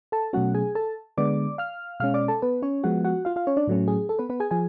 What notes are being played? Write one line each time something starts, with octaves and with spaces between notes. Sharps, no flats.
A4 A5
B2 F#3 A3 C#4 F#4 F#5
G#4 G#5
A4 A5
D3 G#3 B3 D5 D6
F5 F6
B2 G#3 C#4 F5 F6
D5 D6
A4 A5
B3 B4
C#4 C#5
F3 G#3 B3 F#4 F#5
F#4 F#5
F4 F5
F4 F5
C#4 C#5
D4 D5
A2 F#3 A3 C#4
G#4
A4
B3 B4
B3 B4
G#4 G#5
F3 G#4 G#5